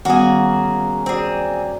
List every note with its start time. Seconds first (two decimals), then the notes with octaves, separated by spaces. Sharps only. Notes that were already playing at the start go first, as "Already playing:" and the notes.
0.05 D#3 G3 A#3 B3 C#4 F#4 G#4 F5
1.06 C4 F#4 G#4 D5